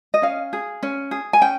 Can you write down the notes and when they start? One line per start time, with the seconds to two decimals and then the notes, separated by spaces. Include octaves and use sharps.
0.14 D#5
0.22 C#4 F5
0.53 G#4
0.83 C#4
1.11 G#4
1.33 G#5
1.42 C#4 G5